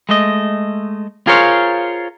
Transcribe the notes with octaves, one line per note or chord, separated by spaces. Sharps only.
G#3 A3 D#5
F4 G#4 A#4 C5 C#5 F5